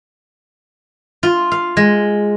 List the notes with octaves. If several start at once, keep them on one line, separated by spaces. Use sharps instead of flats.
F4
F5
G#3